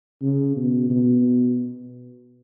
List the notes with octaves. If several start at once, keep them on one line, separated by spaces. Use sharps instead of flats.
C#3
B2
B2